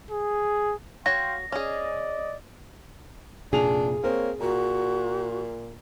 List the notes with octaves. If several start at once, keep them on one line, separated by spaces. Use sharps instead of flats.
G#4
F#4 C#5 F5 G5 C6 A#6
C#4 G#4 D5 D#5
F1 A#2 D4 G#4 F7
A#3 C4 C#5
A#2 F#4 A#5